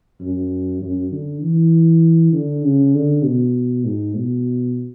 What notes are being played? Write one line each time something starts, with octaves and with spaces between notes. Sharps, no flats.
F#2
F#2
D3
E3
D3
C#3
D3
B2
G#2
B2